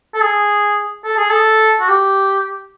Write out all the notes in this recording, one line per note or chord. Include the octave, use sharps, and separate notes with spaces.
A4
G#4
A4
G#4
A4
F#4
G4